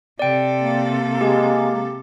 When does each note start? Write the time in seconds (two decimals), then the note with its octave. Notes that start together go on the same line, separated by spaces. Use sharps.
0.19 C3 A4 D5 G5
0.59 A#3
1.21 G#3 G4